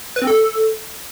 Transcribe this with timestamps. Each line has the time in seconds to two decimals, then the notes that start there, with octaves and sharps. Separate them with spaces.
0.16 B4
0.22 C4
0.27 A4